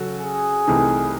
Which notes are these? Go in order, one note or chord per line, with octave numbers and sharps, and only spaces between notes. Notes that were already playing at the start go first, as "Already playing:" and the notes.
Already playing: C#3 F#3 C#4 F#4 A4
G#4
C2 C3 E3 A3 D#4